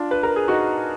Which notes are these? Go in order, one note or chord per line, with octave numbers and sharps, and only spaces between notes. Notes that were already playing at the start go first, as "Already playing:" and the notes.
Already playing: D4 F4
B4
A#4
G#4
D#4 F#4